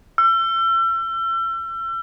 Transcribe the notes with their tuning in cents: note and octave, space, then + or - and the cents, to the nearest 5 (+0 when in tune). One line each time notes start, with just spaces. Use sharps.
E6 +40